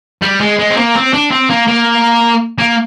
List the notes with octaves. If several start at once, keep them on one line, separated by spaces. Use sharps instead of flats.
G3
G#3
G#3
C4
A#3
C4
D4
C4
A#3
A#3
A#3